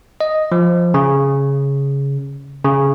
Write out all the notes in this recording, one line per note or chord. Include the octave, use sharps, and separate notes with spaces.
D#5
F3
C#3
C#3